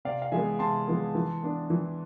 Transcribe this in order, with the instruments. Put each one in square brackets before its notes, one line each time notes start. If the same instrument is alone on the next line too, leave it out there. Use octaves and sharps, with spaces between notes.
[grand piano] C3 D5 F5
F5
E3 G#3 B3 E5 G#5
C3 A5 C6
E3 G#3 B3
E3
B3 D4
E3